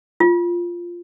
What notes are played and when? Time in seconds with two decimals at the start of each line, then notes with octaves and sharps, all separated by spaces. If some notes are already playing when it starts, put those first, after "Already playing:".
0.20 F4